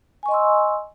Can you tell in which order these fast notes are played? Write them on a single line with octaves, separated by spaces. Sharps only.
G#5 C#6 D#5 C6 E6